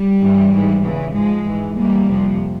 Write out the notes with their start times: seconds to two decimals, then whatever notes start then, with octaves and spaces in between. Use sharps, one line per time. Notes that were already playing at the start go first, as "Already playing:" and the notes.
Already playing: G3
0.20 G2 E3
0.52 G#2 E3
0.82 E2 C#3 E3
1.13 G#2 F3 G#3
1.44 G#2 E3
1.76 E2 E3 G3 A#3
2.07 F2 C3 F3